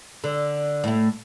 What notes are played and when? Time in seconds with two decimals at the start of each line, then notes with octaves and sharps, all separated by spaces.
0.24 D3
0.84 A2 A3